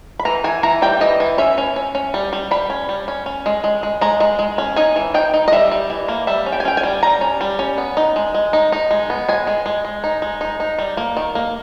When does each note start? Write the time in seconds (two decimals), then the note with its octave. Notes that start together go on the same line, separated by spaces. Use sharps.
0.19 B5
0.25 E3 A#5
0.44 E3 G#5
0.63 E3 A#5
0.82 G3 G5
1.01 E3 D#5
1.20 E3
1.38 C#4 E5
1.58 C#4
1.76 C#4
1.95 C#4
2.14 G3
2.33 G3
2.51 G3 B5
2.70 C#4
2.89 G3
3.08 C#4
3.26 C#4
3.46 G#3
3.64 G#3
3.83 G#3
4.01 G#3 A#5
4.20 G#3
4.39 G#3
4.58 C#4
4.76 D#4 G#5
4.96 E3
5.14 D#4 G5
5.34 D#4
5.48 D#5
5.52 G3 E5
5.71 G3
5.90 E3
6.08 A#3
6.27 G3 E5
6.46 C#4
6.52 G5
6.60 G#5
6.65 C#4 G5
6.77 G#5
6.83 G3
7.03 G3 A#5
7.21 C#4
7.41 G3
7.59 C#4
7.78 B3
7.97 D#4
8.16 G#3
8.35 G#3
8.53 D#4
8.72 D#4
8.91 G#3
9.10 B3
9.28 G#3 G#5
9.47 G#3
9.66 G#3
9.85 G#3
10.04 D#4
10.22 G#3
10.41 D#4
10.60 D#4
10.78 G3
10.97 A#3
11.17 D#3
11.35 A#3